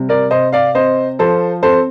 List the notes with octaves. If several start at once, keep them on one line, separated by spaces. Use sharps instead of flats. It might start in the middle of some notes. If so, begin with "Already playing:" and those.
Already playing: C3 G3
A#4 D5
C3 C5 D#5
D5 F5
C4 C5 D#5
F3 A4 C5
C4 A4 C5